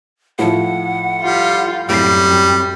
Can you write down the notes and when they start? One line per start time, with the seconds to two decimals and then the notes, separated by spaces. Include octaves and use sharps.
0.39 A2 F3 F#5
1.22 G3 F4
1.89 F#2 A2 G3 C4 C7